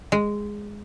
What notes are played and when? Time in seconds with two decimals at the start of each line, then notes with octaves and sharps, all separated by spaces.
0.12 G#3